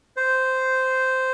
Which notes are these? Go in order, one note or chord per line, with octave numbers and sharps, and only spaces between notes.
C5